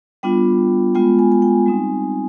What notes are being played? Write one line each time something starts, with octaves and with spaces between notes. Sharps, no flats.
G3 B3 D4 F4 G5
G#3 B3 F4 G5
G#5
G#5
G5
G3 C4 D#4 G#5